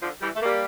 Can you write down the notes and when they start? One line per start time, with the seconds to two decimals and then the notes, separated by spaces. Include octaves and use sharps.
0.02 D3 F3
0.22 E3 G3
0.35 A3
0.42 G3 A#3